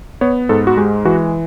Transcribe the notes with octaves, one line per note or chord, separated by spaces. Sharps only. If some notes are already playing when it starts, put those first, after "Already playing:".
B3 C#5
G#2 A4
F#4
G#3 G4
E3 F#4